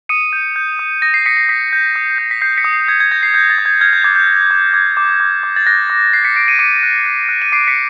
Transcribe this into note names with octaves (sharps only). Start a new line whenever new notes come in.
D#6 C#7 D#7
G6
G6
D#6
D#6 A#6
C7
D#6 B6 C#7
C7
D#6 B6
G6
D#6
G6
B6
G6 C7
B6 C#7
D#6
C7
D#6 G#6
G#6
G6 A#6
C7
G6
A6
D#6
G#6
F6 G#6
G6
D6 G#6
G6
F6
D6
D6 G#6
D6
D6
D6
A6
F#6 A#6
D6
F#6 C7
B6 C#7
F#6 C7 D7
C#7 D#7
D6 C#7 D#7
F#6
F#6
F#6
D#7
D6 C7 D7
B6 C#7